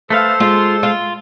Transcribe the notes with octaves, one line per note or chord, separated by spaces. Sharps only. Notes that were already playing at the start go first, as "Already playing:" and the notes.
A3 A4 B4 C5 F5 C6
G#3 F4
F4